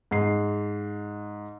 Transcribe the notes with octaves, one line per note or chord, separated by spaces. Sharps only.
G#2 C7